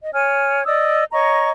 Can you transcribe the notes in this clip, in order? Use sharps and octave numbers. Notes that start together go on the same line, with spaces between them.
D#5
C#5 G#5 F6
D5 D#5 D#6 E6
C#5 D#5 A#5 C#6